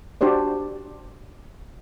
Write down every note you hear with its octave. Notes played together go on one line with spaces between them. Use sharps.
D4 F#4 G4 C5 D5